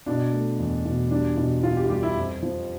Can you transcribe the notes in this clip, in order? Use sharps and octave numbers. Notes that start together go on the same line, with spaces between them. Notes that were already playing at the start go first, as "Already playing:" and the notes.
B2 D4
A3
E2
B2
G3 D4
B2
B2 F4
G4
F4
G3 G4
E4
F2
F3